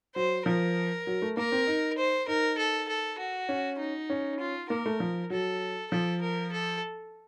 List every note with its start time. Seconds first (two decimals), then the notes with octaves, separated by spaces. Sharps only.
0.15 F#3 C5
0.46 F3 A#4
1.07 F#3
1.22 A3
1.37 A#3 A#4
1.52 C4
1.67 D#4
1.98 C5
2.28 D#4 A#4
2.58 A4
2.88 A4
3.19 F#4
3.49 C#4
3.79 D#4
4.10 C#4
4.40 F4
4.70 A#3 A#4
4.86 A3
5.00 F3
5.30 F#3 A4
5.91 F3 A4
6.21 A#4
6.52 A4